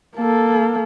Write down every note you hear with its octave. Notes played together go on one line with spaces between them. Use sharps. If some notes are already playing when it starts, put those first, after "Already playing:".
A#3 A4